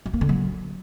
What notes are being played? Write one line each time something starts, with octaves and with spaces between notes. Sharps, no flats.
F#3
A#3
D3
F#3